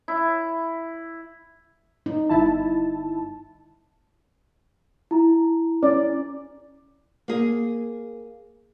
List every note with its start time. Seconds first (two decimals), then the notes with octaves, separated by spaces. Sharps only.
0.08 E4
2.06 D#4
2.29 G1 E4 A5
5.11 E4 A#5
5.83 C#4 D5
7.28 A#3 G#4